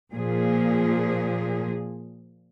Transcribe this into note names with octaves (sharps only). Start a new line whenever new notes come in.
A#2 F3 G#4